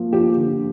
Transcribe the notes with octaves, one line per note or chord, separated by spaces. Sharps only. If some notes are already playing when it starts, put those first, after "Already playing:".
Already playing: F3 A#3
F3 G4
D3